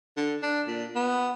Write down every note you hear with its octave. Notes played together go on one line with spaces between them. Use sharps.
D3
D4
A#2
B3